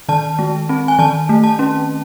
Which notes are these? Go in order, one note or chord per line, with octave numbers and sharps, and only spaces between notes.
D#3 A5
G#3
C4
G#5
D#3 A5
A3
A5
C#4